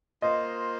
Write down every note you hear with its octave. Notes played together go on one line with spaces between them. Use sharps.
A#3 F4 C5 D#5